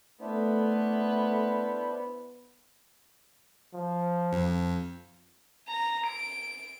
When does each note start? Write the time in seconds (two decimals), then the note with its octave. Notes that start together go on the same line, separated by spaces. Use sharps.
0.21 A3 B3 D4 E4 C5
3.74 F3
4.33 F2
5.68 A#5
6.06 D7